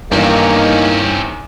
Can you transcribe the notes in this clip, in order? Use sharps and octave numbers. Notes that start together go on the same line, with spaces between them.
E2 G2 D#3 A#3 C4 C#4 D#4